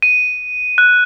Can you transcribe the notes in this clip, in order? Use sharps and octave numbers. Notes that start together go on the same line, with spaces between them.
D#7
F#6